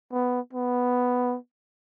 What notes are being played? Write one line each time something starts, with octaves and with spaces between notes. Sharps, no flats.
B3
B3